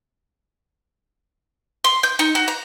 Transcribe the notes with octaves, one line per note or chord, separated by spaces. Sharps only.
C6
G6
D#4
F#4
A#5